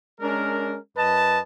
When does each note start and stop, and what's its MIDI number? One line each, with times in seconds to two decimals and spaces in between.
0.20 0.76 56
0.20 0.76 61
0.20 0.76 62
0.20 0.76 70
0.97 1.39 42
0.97 1.39 71
0.97 1.39 75
0.97 1.39 81